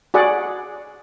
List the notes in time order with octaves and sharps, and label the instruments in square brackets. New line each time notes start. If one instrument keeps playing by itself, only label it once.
[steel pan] F#4 G#4 D5 F#5